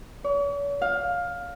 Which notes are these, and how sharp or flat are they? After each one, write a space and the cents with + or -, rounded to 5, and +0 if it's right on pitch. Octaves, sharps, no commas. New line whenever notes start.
C#5 +45
F5 +15